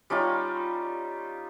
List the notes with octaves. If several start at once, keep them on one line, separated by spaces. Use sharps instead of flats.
G3 C#4 D#4 F4